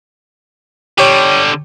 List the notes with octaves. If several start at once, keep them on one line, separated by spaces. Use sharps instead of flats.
D3 G3 G4 C#5